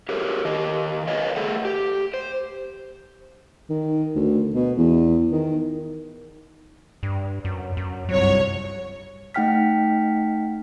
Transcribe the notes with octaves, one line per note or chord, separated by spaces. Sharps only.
G4 A4 A#4 C#5
D#3 G4 D#5
A#4 B4 C#5 D#5 F5 G#5
A3 G#4 A4 F#5
G4
C5
D#3
D2
B2
E2
D#3
G2
F#2
F#2
G1 C2 F#3 C#5
A3 D#4 F#5 G5 F6 B6